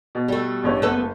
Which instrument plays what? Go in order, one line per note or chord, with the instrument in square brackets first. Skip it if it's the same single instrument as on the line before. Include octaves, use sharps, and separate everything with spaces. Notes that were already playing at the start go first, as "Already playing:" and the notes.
[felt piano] B2
[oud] G3 A3
[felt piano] A1 G2 C#4
[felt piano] F#1 [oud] B3 A4